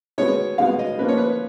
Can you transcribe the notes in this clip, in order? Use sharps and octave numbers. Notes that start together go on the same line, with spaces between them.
B2 G#3 B3 C#5
B2 G#3 B3 F5
D#5
F3 A#3 C#4 B4
C#5
B4